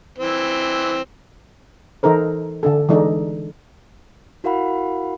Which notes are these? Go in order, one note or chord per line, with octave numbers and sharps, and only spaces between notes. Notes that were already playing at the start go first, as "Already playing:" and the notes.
E3 C4
E3 D#4 A4 A#4 C5
D3 D4 A4
E3 G#3 D4 D#4 A4
E4 F#4 A#4 F5 F#5 B5